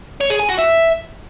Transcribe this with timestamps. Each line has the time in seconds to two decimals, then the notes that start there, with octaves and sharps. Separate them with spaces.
0.21 C#5
0.30 G#4
0.39 G#5
0.49 F#4
0.58 E5